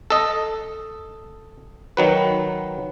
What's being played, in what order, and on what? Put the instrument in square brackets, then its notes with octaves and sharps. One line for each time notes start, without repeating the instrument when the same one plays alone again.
[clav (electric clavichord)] A4 D#5
D#3 F#3 B4